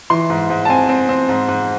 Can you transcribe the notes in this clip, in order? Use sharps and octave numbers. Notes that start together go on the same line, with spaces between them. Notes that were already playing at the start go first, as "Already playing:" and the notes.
E3 C6
G#2
G#2
A5
C4 G#5
C4
C4
G#2
G#2